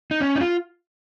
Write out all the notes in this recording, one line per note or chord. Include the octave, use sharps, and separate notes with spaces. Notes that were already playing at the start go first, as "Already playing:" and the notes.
D#4
C#4
D#4
F4